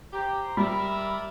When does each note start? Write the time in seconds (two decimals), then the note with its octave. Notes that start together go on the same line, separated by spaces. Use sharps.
0.13 G4 C5 A#5
0.57 G3 A#4 D5 E5 B5